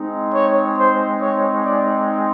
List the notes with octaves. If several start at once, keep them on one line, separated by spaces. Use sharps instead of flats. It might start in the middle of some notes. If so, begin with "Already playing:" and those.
Already playing: G#3 C4 D#4
C#5
C5
C#5
D5